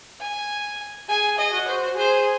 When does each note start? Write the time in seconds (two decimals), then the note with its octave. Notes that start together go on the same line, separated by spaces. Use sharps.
0.20 G#5
1.08 G#4 G#5
1.38 D#5
1.53 F#4
1.67 C5
1.97 G#4 C5